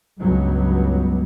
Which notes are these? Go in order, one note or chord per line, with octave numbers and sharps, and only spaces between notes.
C#2 G2 F#3 B3